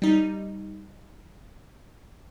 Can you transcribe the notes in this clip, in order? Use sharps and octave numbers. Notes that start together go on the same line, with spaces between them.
G3 D#4